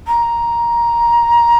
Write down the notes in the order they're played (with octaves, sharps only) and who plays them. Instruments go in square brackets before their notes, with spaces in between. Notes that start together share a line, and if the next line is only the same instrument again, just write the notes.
[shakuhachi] A#5